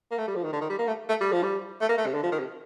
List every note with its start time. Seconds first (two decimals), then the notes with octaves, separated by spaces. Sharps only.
0.11 A#3
0.18 A3
0.28 G3
0.36 F3
0.44 D#3
0.53 D3
0.61 D#3
0.70 G3
0.79 A#3
0.87 A3
1.09 A3
1.21 G3
1.32 F3
1.43 G3
1.81 A3
1.89 A#3
1.98 A3
2.06 C3
2.14 D3
2.23 F3
2.32 D#3
2.40 C3